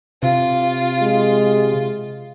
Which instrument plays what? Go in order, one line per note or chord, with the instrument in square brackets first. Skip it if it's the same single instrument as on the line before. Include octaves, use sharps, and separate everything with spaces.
[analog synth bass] C3 [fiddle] F4
[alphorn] G#3